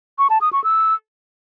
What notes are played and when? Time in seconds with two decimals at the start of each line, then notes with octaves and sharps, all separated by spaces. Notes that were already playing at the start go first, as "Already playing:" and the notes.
0.19 C#6
0.30 A5
0.41 D#6
0.53 C#6
0.64 E6